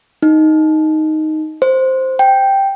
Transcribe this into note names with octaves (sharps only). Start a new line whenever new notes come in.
D#4
C5
G5